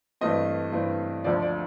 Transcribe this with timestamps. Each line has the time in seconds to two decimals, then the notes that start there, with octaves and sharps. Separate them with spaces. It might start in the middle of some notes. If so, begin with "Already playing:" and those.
0.21 G2 E3 A3 C4 D#5
0.72 G2 E3 A3 C4
1.24 D2 D3 F3 D5
1.42 D5